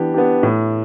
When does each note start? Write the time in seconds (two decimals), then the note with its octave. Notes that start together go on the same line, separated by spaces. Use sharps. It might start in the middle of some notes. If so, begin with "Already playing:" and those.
Already playing: E3 B3 D4 G4
0.14 B3 D4 G4
0.43 A2